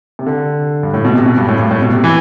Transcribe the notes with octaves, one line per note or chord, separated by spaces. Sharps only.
C3
D3
G2
A2
B2
C3
B2
G2
A2
G2
A2
B2
C3
E3